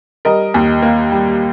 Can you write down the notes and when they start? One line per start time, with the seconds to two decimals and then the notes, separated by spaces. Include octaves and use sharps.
0.25 G3 A#4 D#5
0.54 D#2
0.82 A#3
1.12 G3